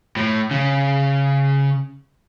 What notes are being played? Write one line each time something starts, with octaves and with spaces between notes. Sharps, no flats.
A2
C#3